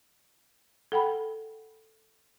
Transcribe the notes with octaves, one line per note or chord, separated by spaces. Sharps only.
A4 F#5 G5 B5